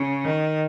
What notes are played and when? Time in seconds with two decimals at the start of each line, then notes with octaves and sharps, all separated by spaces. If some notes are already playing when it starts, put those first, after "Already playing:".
Already playing: C#3
0.25 D#3